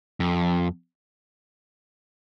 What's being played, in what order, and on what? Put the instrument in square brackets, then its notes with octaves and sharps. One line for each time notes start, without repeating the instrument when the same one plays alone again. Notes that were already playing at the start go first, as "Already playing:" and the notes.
[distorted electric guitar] F2